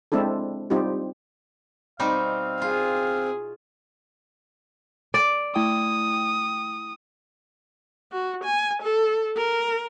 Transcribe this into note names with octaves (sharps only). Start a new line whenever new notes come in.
G#3 C4 D4 E4 A4
G3 C4 D#4 F4 G4
B2 G3 C4 D#4 F5
F4 G#4
D5
A3 E4 G5 D#6
F#4
G#5
A4
A#4